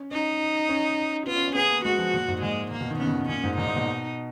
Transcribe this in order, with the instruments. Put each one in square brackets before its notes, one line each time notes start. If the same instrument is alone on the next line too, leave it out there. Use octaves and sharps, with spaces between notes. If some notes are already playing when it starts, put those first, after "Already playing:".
Already playing: [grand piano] C#4
[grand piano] C#4 [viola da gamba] D#4
[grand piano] C#4
[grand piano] B3 [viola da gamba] F4
[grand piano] C#4
C#4
[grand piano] B3 [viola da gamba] G#4
[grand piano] A#3
[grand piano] G#3 [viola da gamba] F#4
[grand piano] F3
A#2
G#2
[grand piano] A#2 [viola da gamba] G#3
[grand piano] A#2 [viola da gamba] A#3
[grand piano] B2
D#3
[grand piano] C#3 [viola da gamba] B3
[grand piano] B2
A#2
[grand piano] A#2 [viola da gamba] C#4
[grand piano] G#2
[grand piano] A#2 [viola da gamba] D#4
[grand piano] A#2
B2